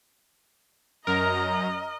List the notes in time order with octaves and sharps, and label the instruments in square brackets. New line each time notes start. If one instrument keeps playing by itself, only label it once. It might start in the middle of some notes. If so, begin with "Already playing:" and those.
[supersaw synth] F#2 [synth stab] A#4 [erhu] D#5 [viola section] A#5